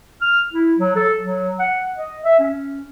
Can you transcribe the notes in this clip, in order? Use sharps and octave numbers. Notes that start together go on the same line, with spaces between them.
F6
E4
F#3
A4
F#3
F#5
D#5
E5
C#4